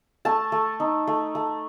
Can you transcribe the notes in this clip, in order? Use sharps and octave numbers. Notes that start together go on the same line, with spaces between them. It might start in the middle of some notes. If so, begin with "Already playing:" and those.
A3 A5
A3
D#4
A3
A3